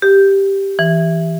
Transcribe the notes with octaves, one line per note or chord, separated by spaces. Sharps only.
G4
E3